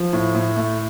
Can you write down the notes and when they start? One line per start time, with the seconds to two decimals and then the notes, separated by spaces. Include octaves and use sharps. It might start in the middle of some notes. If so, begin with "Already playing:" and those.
Already playing: F3
0.13 A2
0.35 A2
0.56 A3